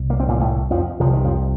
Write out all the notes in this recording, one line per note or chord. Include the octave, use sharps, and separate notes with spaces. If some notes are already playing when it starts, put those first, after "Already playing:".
Already playing: C2
A#3
C4
A#2 A#3
A2 A3
F2 F3
C2 C3 F3
D#3
F2 F3